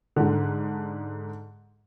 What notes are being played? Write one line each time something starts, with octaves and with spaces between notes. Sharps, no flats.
G#2 D3